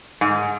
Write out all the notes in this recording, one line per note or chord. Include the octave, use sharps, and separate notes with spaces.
G#2